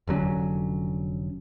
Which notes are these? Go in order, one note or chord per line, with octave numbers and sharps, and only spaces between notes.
F1 D3 F#3 C#4